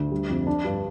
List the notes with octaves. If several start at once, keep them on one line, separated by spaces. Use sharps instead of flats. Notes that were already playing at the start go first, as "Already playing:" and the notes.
Already playing: D2
G3
F2
D4
G2